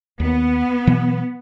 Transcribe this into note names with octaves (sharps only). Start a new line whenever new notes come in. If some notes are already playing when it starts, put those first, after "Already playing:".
D#2 B3
B2 E3 F#3